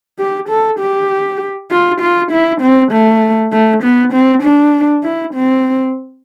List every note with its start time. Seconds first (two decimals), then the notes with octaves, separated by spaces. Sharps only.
0.19 G4
0.49 A4
0.80 G4
1.71 F4
2.01 F4
2.31 E4
2.61 C4
2.92 A3
3.52 A3
3.83 B3
4.13 C4
4.43 D4
5.04 E4
5.34 C4